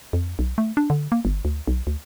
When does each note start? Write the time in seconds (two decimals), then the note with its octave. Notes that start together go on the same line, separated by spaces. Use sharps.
0.13 F2
0.39 B1
0.58 A3
0.77 D4
0.90 D3
1.12 A#3
1.25 G1
1.45 D2
1.67 B1
1.87 D2